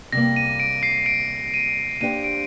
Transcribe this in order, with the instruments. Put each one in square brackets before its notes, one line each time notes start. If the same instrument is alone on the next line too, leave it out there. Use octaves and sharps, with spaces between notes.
[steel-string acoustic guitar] C3 G3 A#3 [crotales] A#6
[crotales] D#7
D7
C7
D7
D#7
[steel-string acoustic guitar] A#3 D4 G4 C5 [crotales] D#7
[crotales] D7